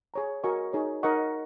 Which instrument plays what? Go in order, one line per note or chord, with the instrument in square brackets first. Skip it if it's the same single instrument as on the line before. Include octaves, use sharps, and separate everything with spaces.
[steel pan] G#4 C#5 A#5
F#4 A#4 D#5 G#5 C#6
D#4 G#4 C#5
D#4 A#4 D#5 F#5 C#6